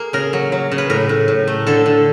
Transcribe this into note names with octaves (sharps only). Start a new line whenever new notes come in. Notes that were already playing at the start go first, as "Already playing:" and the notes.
Already playing: A#3 G#4
C#3 A#4
F#3
F#3
C#3
B4
A2 A#4
A2
A2
A3
D3 A4
D3